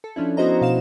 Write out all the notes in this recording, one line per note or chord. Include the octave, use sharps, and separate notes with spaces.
A4
F3 C#4 D4 E4
B3 E4 F#4 C5 D#5 A#5
B2 F5 E7